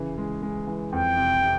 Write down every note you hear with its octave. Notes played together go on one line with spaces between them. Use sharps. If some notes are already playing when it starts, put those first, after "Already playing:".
Already playing: C#3 E3
G#3
G#3
E3
F2 G5
C3
C3